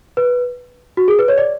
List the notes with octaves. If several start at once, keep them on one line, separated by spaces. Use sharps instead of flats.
B4
F#4
G#4
B4
C#5
D5